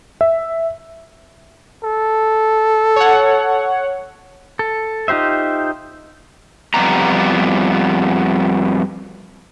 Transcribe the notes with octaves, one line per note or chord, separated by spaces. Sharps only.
E5
A4
C#5 F#5
A4
D#4 F4 G4 C5 E5
F2 G3 B3 G4 A#5